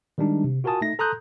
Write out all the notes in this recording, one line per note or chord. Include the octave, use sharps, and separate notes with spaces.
D#3 G3 G#3 D4 D#4
C3
F4 F#4 A#4 G#5 A5 D#6
A3 D#4 A#6
A4 A#5 C6 D#6 F#6 G6